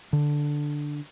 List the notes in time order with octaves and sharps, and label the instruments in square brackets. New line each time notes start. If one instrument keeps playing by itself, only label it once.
[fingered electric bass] D3